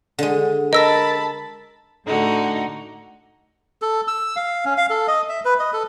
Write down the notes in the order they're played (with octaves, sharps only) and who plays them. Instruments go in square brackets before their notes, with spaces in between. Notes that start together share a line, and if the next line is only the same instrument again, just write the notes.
[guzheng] D3 G#3
[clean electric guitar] A#4 [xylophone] D#5 E6 A#6 [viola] A5 B5
[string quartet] A2 D3 D#4 F#4
[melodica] A4
E6
F5
C#4
F5
A4
D#5
E5
B4
D#5
A4